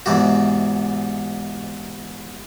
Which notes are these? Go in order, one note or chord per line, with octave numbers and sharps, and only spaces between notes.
E2 G#2 C3 F#4